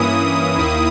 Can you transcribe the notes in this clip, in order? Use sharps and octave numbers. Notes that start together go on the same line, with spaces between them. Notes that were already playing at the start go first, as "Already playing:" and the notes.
Already playing: G2 E3 A#3 C#4 E4 D#6
D#2 D#3 A#3 E4